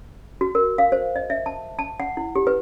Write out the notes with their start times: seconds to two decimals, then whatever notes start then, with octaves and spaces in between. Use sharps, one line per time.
0.41 F#4
0.55 A#4
0.78 F5
0.92 C5
1.16 D#5
1.30 E5
1.46 A5
1.79 A5
2.00 F#5
2.17 E4
2.36 G4
2.47 B4